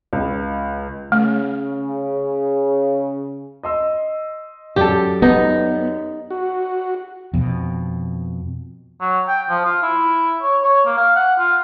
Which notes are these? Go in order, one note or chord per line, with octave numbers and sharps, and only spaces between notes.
C#2
C#3 A3
D#5 C6 E6
F#2 G4 A4 D5
B3 D#4
F#4
F2 B2
F#3
G5
F3
F4
E4
C#5
C#5
A#3
F5
F#5
F4